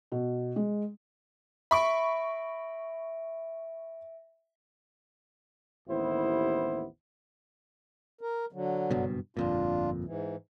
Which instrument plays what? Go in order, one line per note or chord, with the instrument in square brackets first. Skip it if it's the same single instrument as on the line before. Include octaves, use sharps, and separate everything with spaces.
[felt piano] B2
G#3
[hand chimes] E5 D7 [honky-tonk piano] B5 C#6
[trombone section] A1 D#2 B3 E4 C5
[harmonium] A#4
D3 F#3
[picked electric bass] F#1 G2 B2
[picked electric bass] G1 F2 A#2 [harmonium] D4 F4
[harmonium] G#2 E3